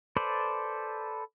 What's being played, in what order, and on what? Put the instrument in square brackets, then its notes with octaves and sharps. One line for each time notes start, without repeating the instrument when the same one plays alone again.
[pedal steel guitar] A4 B4 C5 D5